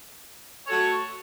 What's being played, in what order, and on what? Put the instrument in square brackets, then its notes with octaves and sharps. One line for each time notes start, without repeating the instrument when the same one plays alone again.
[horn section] A3 F#4 A4 C#5